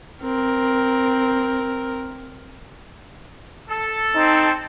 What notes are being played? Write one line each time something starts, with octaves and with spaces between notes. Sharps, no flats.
C4 A#4
A4
C4 D#4